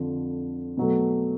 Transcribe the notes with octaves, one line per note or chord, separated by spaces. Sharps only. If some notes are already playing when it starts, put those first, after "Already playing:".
Already playing: F2 D3 F3
B2 F#3 A3